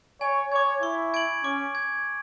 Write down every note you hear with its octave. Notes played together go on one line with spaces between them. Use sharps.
C#5 G#5
C#5 D6 G#6
E4 C#6
G#6 D7 F#7
C#4 D6
G#6